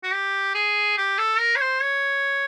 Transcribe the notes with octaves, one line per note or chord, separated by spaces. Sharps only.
F#4
G4
G#4
G4
A4
A#4
C#5
C5
C#5